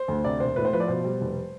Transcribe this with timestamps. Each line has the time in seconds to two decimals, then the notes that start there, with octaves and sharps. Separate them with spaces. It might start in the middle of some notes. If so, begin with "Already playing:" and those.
Already playing: C5
0.08 D2
0.24 C3 D5
0.40 E1 C5
0.56 A2 B4
0.65 C5
0.73 F3 B4
0.80 D5
0.88 B2 C5
1.05 G3
1.21 F1